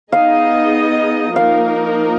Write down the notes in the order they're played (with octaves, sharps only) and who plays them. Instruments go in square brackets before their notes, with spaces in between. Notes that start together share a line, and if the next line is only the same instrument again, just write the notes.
[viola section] B3 D#4 G#4 D#5 [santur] F5
[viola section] F3 A#3 D#4 A#4 [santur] F5